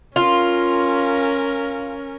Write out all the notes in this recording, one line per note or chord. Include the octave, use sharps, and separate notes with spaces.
C#4 F4 A#4